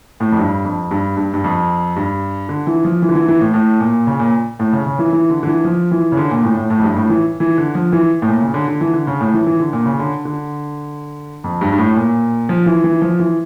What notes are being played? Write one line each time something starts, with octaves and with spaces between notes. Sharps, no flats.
A2
F2
G2
F2
G2
G2
G2
F2
G2
D3
E3
F3
E3
D3
E3
E3
A2
A2
A#2
C#3
A#2
A2
C#3
C#3
E3
E3
D3
D3
E3
F3
E3
C#3
D3
A#2
A2
A2
A2
F2
G2
A2
E3
E3
D3
F3
E3
A2
A#2
C#3
D3
D3
E3
D3
C#3
A2
E3
E3
D3
A#2
C#3
D3
D3
F2
G2
G2
A2
A#2
F3
E3
E3
F3
E3